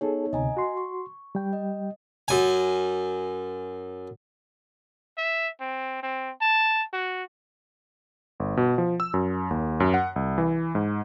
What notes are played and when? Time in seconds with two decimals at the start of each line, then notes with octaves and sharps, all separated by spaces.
0.01 B3 D#4 G#4 A4 C#5
0.33 D2 C3 D#5 G#5 A#5
0.57 F#4 C6
0.77 C#6
1.35 G3 G5
1.53 D#5
2.28 F#2 G#5
5.18 E5
5.60 C4
6.03 C4
6.41 A5
6.93 F#4
8.40 G1
8.57 B2
8.78 F3
9.00 E6
9.14 F#2
9.51 D#2
9.80 F#2
9.94 F#5
10.16 C2
10.38 E3
10.75 G#2